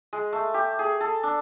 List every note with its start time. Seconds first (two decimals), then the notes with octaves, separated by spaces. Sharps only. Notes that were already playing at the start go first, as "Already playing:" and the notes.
0.13 G#3
0.33 A3
0.54 G4
0.79 G#4
1.01 A4
1.23 D4